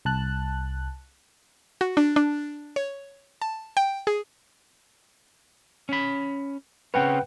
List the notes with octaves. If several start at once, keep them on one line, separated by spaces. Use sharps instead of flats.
C2 A5 F#6
F#4
D4
D4
C#5
A5
G5
G#4
C#4 B5
C#3 C4 C#4 B4 F#5 G5